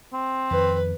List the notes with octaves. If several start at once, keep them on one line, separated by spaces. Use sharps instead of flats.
C4
F2 D#3 B4